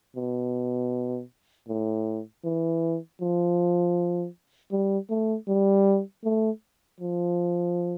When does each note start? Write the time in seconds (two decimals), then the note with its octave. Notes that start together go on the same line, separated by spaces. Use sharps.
0.16 B2
1.68 A2
2.44 E3
3.21 F3
4.72 G3
5.10 A3
5.48 G3
6.24 A3
7.00 F3